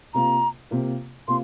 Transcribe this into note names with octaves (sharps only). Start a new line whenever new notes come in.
C3 A#3 F4 A#5
C3 A#3 F4
C3 A#3 F4 C6